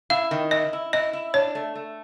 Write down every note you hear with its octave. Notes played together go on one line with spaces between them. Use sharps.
E4 F5
D#3
E4 D#5
E4
E4 D#5
E4
D4 C#5
A3
A3